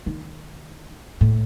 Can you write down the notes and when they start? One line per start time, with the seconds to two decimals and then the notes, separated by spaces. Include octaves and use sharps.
0.06 D#3
1.21 A2